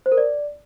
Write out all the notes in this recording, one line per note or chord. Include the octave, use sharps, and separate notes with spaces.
C5
A#4
D5